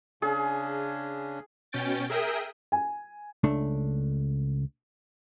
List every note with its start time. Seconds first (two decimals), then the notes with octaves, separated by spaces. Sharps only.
0.22 C#3 C#4 D4 G#4
1.72 B2 C#4 G5 A6
2.10 G#4 A#4 E5 G5 D#6
2.72 G#5
3.44 C#2 A3 D4